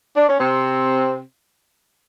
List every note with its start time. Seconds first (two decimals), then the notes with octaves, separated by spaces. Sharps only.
0.16 D4
0.28 C#4
0.39 C3 C4